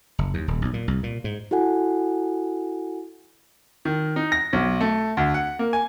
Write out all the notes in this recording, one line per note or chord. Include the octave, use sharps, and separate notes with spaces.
F#1
D#2
D#1
B1
A#2
C2
A#2
G#2
E4 F#4 A4 F#5 G#5
D#3
D#4
A#6
B1
A3
D2
F#5
A#3
G#5